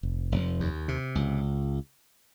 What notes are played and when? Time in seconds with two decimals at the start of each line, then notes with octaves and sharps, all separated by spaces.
0.03 F1
0.32 F1
0.60 D#2
0.88 C3
1.15 C#2